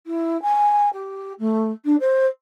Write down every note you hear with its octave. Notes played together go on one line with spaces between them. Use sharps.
E4
G#5
G4
A3
D4
C5